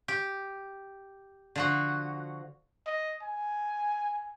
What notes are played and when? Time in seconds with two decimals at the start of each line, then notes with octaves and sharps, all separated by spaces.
0.08 G4
1.56 D3 F3 F#4
2.87 D#5
3.22 G#5